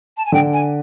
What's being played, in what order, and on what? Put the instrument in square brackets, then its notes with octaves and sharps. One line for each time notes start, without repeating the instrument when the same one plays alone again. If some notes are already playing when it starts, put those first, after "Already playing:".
[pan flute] A5
G#5
[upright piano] D3 [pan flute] G5
[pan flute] G#5